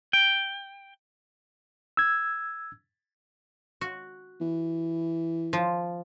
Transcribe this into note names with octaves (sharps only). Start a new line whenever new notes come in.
G5
E6 G#6
F#4
E3
F3